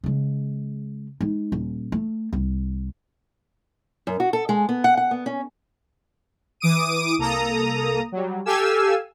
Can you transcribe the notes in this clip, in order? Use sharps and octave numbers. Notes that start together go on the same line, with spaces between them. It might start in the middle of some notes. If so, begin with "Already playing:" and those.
C#3 G#3
G#3 D#4
D#1
A3
C2
F#2
F#4
A4
G#3
B3
F#5
F#5
B3
C#4
E3 D6 D#6 D7 D#7
C2 A#3 A4 A#5 D#6
F#3 G3
G4 A4 F5 G#5 E6